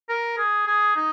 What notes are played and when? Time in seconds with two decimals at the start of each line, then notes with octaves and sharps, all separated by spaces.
0.09 A#4
0.37 G#4
0.67 G#4
0.96 D#4